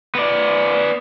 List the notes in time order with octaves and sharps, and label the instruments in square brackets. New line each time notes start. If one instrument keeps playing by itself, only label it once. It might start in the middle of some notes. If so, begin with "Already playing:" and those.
[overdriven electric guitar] B3 D5